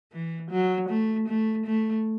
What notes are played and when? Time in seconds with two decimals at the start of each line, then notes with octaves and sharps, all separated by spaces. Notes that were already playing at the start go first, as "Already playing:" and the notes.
0.12 E3
0.51 F#3
0.89 A3
1.28 A3
1.66 A3